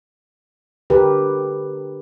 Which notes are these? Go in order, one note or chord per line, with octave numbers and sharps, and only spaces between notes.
D3 G4 A#4 B4